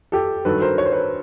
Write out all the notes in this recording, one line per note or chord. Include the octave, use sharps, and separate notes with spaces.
G4 A4
G2 D#3 F#3 A4 B4
A#4 C5
C#5
C5
B4 C#5